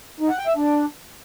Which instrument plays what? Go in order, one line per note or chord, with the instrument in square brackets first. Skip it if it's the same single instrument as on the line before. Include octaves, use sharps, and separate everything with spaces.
[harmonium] D#4
F#5
G5
E5
D4